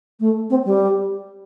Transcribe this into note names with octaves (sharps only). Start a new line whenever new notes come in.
A3
C4
G3